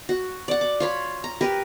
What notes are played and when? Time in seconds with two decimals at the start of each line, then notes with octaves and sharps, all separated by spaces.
0.09 F#4
0.48 D5 F#5
0.61 D6
0.80 F4 C#5 B5
1.24 A#5
1.41 G4 A#4 B4